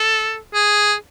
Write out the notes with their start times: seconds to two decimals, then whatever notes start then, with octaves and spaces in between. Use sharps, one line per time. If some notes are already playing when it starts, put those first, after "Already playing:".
Already playing: A4
0.54 G#4